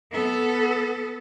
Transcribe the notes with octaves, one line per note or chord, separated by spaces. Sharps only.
B3 A4